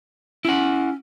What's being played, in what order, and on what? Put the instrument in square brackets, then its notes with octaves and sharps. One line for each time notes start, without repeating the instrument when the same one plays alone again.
[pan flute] C#4 [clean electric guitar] E4 F#5